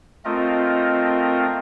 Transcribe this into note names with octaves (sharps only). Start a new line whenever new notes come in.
A3 C4 F4 A#4 D#5